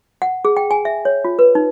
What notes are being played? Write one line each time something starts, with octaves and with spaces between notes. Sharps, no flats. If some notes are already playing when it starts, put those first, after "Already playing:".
F#5
G#4
G5
G#5
E5
C#5
F4
B4
D#4